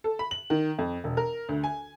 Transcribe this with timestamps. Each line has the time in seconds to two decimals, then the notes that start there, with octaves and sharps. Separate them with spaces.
0.04 A4
0.19 B5
0.31 F#7
0.50 D#3
0.78 F2
1.04 E1
1.17 A#4
1.49 D2
1.64 G#5